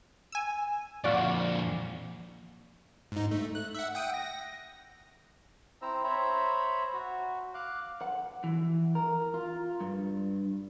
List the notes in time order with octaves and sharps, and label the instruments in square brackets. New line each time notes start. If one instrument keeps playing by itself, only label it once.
[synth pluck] G#5 E6
[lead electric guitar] F2 A#2 [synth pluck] F4 F#4 D5
[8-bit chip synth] G#2 D#4
A3
F#6
E5 F#5
F#5 G5 D#6
A#6
[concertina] C4 E4 C5 A#5 E6
C5 C#5 E5 A#5 B5
F#4
F5 D6 F#6
[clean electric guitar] F#5
E3
A#4
F4
G2